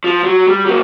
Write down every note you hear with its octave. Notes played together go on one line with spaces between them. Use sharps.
F3
F#3
G3
F#3 A#3